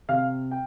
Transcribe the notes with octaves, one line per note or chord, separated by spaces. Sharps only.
C3 F5 F6
G5